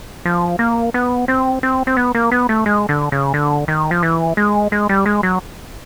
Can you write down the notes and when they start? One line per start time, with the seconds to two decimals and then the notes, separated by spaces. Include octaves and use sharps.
0.25 F3
0.59 A#3
0.94 B3
1.28 C4
1.63 C4
1.87 C4
1.97 B3
2.15 A#3
2.31 B3
2.49 A3
2.66 G#3
2.89 D3
3.12 C#3
3.34 D3
3.68 D#3
3.91 F3
4.03 E3
4.37 G#3
4.72 G#3
4.89 G3
5.06 G#3
5.23 F#3